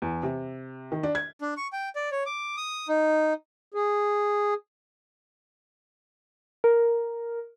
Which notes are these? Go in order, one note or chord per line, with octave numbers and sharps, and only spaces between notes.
E2
C3
D#3
D4
G#6
D4
C#6
G5
D5
C#5
D6
D#6
D#4
G#4
A#4